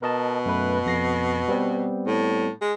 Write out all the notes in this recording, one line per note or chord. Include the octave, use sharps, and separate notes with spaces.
B2 A#4 D#5 A5
F#2 A3 B4
F2 A#6 C7
G3 B3 C4
A2
G#3